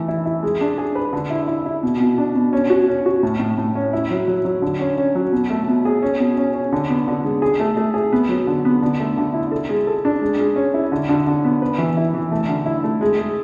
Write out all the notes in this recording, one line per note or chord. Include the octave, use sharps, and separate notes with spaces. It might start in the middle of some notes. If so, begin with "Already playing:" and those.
Already playing: E3 A3
E4
E4
G#3
D4
G#4
B4
D3
E4
E4
E4
B2
B2
D4
B2
C#4
F#4
C#4
F#4
A2
A2
A2
C#4
E4
F#3
F#3
F#3
D3
C#4
C#4
F#3
B2
A3
B2
G#4
C#4
B2
C#4
C#4
D3
B3
D3
G#3
G#4
A3
A3
G#4
B3
F#3
D3
B3
D3
A3
D3
E4
A4
G#3
A4
D4
G#3
G#3
C#4
E4
D3
D3
D3
B3
B4
E3
E4
E3
A3
D3
E4
A3
G#3
G#3